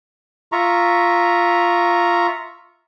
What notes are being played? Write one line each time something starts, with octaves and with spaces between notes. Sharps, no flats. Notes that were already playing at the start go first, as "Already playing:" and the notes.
F4 E5 A#5 C#6